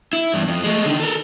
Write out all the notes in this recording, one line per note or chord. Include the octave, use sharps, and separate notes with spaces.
E4
E2 G2
F2
G#3 A3
D3 D#3
A4 A#4